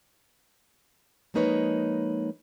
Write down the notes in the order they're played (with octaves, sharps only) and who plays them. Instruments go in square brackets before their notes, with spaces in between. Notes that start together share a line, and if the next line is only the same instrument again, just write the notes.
[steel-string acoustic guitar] F3 G#3 A#3 D#4 B4 C#5